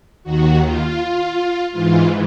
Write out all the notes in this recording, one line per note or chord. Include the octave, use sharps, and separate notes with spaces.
D#2 D#3 F#4
F4
G#2 E3 F4